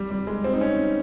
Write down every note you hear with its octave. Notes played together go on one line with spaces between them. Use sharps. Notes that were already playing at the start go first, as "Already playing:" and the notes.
Already playing: G3
G3
G#3
C4
D#4
C#4